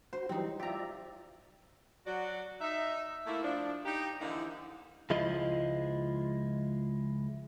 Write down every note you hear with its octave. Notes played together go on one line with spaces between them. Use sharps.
F#4 C5
E3 F#3 G3 C4 D#4
F4 G4 D5 E5 A#5
F#3 F#4 D5
D#4 E5
A3 A#3 E4
F3 D4
D#4 G4
D3 E3 F3 A#3 D#4 E4
C#2 F3 G#3 E4 F4 D#5